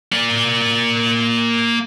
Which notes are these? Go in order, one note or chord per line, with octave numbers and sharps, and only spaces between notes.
A#3 D5